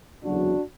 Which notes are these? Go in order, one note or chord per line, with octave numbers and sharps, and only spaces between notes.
F#1 E2 D3 F#3 D4 F#4